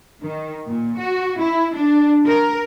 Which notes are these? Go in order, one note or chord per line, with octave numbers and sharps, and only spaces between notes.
D#3
A#2
F#4
E4
D4
A#4